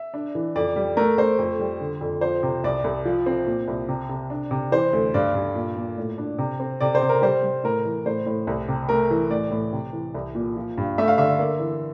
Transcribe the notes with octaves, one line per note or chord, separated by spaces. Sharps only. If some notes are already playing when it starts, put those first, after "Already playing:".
Already playing: E5
D4
E3
F2 D5
G3
A3 A#4
A3 C5
F2
G3
D3
F2
F3 C5
C3
C2 D5
C2
F3
C4
A#2
C2
C3
C3
D4
C3
E3 C5
D2
G2 D5
G2
A#2
A#2
A2
D4
C3
C4
C3 D5
C5
C3
A#4
G3 C5
G3
A2 A#4
E3
A2 C5
A2
C2
C3
A3 A#4
E3
A2 D5
A2
C3
E3
C2
A#2
F3
G2
A3 E5
F5
D3 E5
A#3
E3